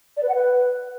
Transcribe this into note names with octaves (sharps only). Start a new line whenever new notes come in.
D5
B4
F#5
B4